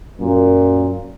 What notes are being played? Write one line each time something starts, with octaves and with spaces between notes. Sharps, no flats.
F#2 A#2